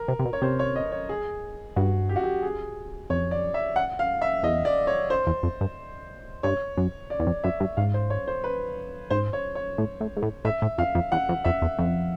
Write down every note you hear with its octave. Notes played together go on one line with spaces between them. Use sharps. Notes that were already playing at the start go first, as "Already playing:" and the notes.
Already playing: A#4
C3
C3
B2
C#5
C3 C5
C#5
D#5
C#5
G#4
G2 F#4
G4
F#4
G4
G#4
F2 C#5
D5
E5
F#5
F5
E5
E2 D#5
D5
C#5
C5
E2
F2
G2
G2 C#5
F#2
D5
E2
F2
F#2 E5
G2
G#2 F5
C5
C#5
C5
B4
G#2 C5
C#5
C#5
A2
A2
G#2
A2
A2 E5
A2
F2 F5
F2
E2 F#5
F2
F2 E5
E2
F2